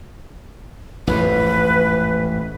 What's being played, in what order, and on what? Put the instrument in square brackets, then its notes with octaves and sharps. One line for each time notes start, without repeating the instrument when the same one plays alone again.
[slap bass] A1 F2 G#2 [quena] B4